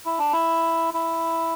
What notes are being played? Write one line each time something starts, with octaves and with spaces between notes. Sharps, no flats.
E4
D4
E4
E4